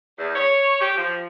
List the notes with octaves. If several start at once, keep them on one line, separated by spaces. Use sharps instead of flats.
E2
C#5
G4
F3